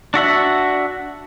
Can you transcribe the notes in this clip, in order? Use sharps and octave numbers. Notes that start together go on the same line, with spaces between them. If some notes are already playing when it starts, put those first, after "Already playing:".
D4 F#4 E5 F#5